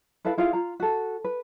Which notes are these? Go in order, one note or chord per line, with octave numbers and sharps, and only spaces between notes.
E4 A4 B4 F5
E4 F4 G#4 F5
F4 A#5
F#4 A4
B4